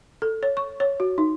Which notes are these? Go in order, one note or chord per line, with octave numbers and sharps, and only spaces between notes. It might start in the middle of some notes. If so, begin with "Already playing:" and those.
A4
C#5
C#6
C#5
F#4
D#4